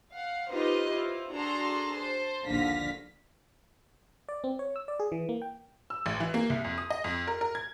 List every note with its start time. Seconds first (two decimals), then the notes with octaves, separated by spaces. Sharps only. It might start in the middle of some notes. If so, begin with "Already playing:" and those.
0.11 F5 F#5
0.51 D#4 F4 G4 B4 C5 D#5
0.91 E4 F4 C5
1.33 D4 F#4 G#4 A4 A#5 C6
1.95 C5 A5 C6
2.44 A#1 D#2 D3 F5 A#6 B6
4.29 D5
4.44 C4
4.59 C#5
4.76 E6
4.88 D5
5.00 G#4
5.12 E3
5.29 A#3
5.42 G5
5.90 E6
6.06 A1
6.20 E3
6.34 A#3
6.50 C2
6.64 F2
6.78 D#6
6.90 D#5
7.04 F2
7.28 A#4
7.41 A#4
7.55 G#6